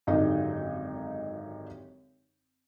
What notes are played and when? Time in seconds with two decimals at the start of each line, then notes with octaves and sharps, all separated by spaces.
0.07 G#1 F#2 D3 D#4 G4 D#5